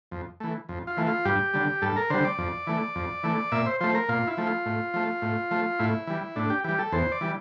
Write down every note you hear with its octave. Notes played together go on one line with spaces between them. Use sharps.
F2
E3 A3
F2
F4
E3 A3
F4
G2 G4
D3 G3
G2 A4
A#4
D3 G3 C5
D5
F2
E3 A3
F2
E3 A3
A#2 E5
C5
F3 A3 C5
A#4
A#2 F4
E4
F3 A3
F4
A2
F3 A3
A2
F3 A3
A2 E4
E3 G3
A2 D4
G4
E3 G3 G4
A4
E2 C5
D5
E3 G3